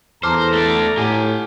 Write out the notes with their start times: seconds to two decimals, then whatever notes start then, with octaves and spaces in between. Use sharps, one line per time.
0.23 E2 A4 C5 A5 A#5 D6 F6
0.53 A3 D5
0.98 A2 G4 G#5